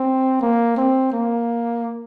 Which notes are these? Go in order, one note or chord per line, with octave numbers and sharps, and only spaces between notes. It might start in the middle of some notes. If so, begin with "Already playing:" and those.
Already playing: C4
A#3
C4
A#3